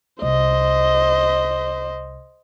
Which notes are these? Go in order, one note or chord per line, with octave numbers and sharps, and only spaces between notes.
C2 C5 D#5